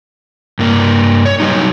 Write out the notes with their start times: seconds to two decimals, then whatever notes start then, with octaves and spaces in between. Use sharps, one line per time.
0.59 G2 A#3
1.25 C#5
1.40 F#3 G3 D#4